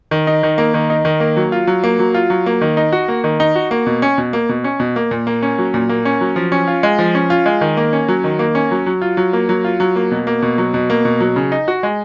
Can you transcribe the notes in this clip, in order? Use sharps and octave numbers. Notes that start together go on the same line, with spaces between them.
D#3
D#4
D#3
A#3
D#3
D#4
D#3
A#3
F#3
F4
F#3
A#3
F#3
F4
F#3
A#3
D#3
D#4
F#4
A#3
D#3
D#4
F#4
A#3
B2
C#4
B2
A#3
B2
C#4
B2
A#3
A#2
A#3
C#4
F#3
A#2
A#3
C#4
F#3
F3
C#4
F4
G#3
F3
C#4
F4
G#3
D#3
A#3
C#4
F#3
D#3
A#3
C#4
F#3
F#3
F4
F#3
A#3
F#3
F4
F#3
A#3
B2
A#3
B2
F#3
B2
A#3
B2
F#3
C#3
D#4
F#4
G#3